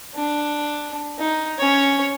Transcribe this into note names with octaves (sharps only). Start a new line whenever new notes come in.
D4
D#4
C#4 C#5